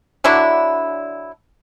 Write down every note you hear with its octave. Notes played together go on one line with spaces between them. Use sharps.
D3 F#3 D4 E4